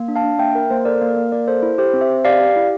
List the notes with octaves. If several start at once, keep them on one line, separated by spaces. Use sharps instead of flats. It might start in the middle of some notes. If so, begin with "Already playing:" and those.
Already playing: A#3
D4
F5 A5
D4
A#3 E5 G5
A#3 A#4
A#3 C5
A4 A#4 D5
A#3
A#4
A#3
A#3 A#4 D5
A4 C5
E4
G4 C5
C4
C5 E5
C4
G4 D5 F5
G4
E4